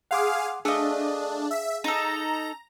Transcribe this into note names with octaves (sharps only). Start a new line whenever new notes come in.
G#4 F5 F#5 C6 D6
A3 D4 G#4 D#5 F5
E5
D#4 A4 A#5